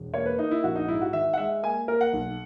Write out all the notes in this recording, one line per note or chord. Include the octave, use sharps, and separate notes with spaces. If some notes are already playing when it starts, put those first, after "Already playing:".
Already playing: E1
A#3 C#5
B4
A#3 D#4
E4
A#1 F#4
D#4
G#2 E4
F#4
D#3 E5
F#5
G#3 E5
A#3 G#5
A#3 A#4
F#5
B1